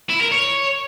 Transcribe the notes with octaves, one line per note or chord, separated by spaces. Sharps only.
E4
A#4
C#5